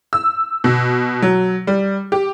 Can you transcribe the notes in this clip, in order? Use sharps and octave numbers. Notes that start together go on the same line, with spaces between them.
E6
B2
F#3
G3
G4